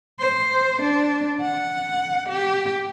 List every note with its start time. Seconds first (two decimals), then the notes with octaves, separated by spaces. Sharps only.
0.20 C5
0.81 D4
1.41 F#5
2.28 G4